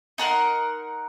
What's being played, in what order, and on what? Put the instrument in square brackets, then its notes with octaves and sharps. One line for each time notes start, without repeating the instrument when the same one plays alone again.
[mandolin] D#4 A#4 F#5 C6